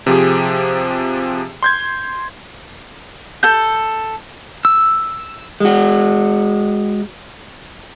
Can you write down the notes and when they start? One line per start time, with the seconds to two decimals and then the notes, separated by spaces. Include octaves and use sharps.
0.06 C3 F3 G4 G#4
1.63 C6 G6 G#6
3.43 A4 G6
4.65 E6
5.60 G#3 F#4